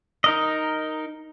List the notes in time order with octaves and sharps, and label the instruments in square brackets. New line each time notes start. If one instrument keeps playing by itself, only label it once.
[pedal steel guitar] D#4 A#4 D#5